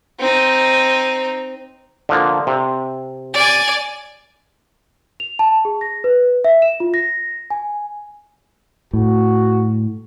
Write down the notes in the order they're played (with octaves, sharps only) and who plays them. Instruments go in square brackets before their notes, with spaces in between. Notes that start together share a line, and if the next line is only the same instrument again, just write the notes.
[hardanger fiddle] C4 D#4
[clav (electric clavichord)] D3 F3 A#3
C3
[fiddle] D5 G#5
[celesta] F7
A5
G#4
A#6
B4
E5
E7
F4
A#6
G#5
[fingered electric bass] A2 [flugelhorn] F#4